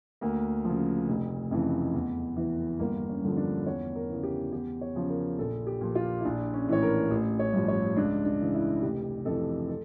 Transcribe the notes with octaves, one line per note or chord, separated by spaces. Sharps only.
D2 A#3
C#3 F3
F1
F2 C#3 E3
E2
E3
G1 A#3
C#4
G2 D3 F3
D4
E2 C#5
A#4
C#3 E3
G4
E2 G4
C#5
C#3 F3
A#4
A#1 A4
G4
A#2 F3
F4
E4
A#1 D4
C#4
A2 E3 C#5
A#4
A1
C#5
G2 F3
C#5
C#2 D4
D4
C#3 E3
E4
F1 G4
F2 E3 A4
A4